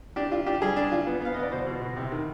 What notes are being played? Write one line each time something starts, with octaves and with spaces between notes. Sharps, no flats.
D4 G4
F4
D4 G4
G3 G#4
D4
F4
B3
B3 F5
B3 D#5
D5
B2 C5
B2
B2
C3
D#3